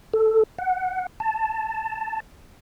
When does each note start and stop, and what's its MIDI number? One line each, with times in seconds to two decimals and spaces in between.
0.13 0.43 69
0.58 1.06 78
1.20 2.20 81